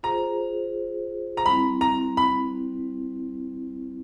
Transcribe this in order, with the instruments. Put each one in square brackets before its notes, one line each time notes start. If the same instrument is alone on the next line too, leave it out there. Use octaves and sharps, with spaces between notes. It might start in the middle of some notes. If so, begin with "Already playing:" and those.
[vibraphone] F4 G#4 C5 [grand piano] A#5
[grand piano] A#5
[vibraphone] G3 C4 E4 [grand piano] B5
[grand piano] A#5
B5